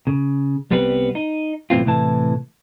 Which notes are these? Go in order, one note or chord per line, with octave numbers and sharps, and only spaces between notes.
C#3
C2 G3 B3 C4 B4
D#4
B1 A2 E3 C4 F4
A2 C3 E3 A5